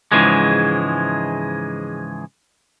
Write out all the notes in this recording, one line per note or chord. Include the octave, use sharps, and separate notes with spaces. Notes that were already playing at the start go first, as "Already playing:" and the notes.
G#2 C#3 E3 F3 G#3